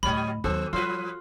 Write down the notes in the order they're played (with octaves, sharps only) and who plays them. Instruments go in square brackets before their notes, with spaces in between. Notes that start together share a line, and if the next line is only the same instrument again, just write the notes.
[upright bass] D2 A2 [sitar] F#3 C#5 D#5 [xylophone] B5
[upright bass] D#2 F#3 [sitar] B3 [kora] F#4 A4
[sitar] F3 B4 [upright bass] G3 [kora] F4 F#4